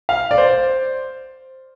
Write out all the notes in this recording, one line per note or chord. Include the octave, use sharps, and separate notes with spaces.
F5
D5
C5